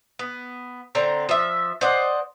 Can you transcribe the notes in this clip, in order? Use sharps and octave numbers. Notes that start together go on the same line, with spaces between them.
B3
D3 C4 G5 A#5
F3 E5
C5 D5 D#5 F#5